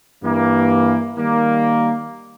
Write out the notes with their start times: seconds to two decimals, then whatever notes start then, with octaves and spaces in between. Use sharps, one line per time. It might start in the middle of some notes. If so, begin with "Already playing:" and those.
0.22 G2 E3 A#3
1.16 D#3 G3 A#3